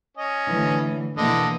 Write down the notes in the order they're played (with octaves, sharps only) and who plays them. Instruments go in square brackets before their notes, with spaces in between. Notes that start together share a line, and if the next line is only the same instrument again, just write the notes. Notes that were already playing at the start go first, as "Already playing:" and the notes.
[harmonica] C#4 D#5
[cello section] A2 D3 E3
[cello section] B2 E3 A#3 [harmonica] D3 D#5